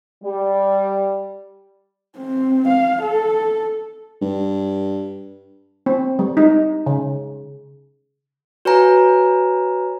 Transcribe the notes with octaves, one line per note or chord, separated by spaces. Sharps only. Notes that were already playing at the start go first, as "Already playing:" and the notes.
G3
C4
F5
A4
G2
C4
G3
D#4
C#3
F#4 B4 C#5 G#5 A#5